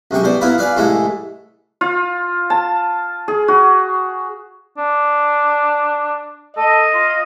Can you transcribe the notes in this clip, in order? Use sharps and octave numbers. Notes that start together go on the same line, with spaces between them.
C#2 F#2 C3 G5 C#6
C2 B2 C5 D5
A#3 B3 E4 F4 A#4 B4
F4 B4 D5 F5 G#5
C2 A2 E3 G#3 E4 A4
F4
A5
G#4
F#4
D4
A4 D#5
F4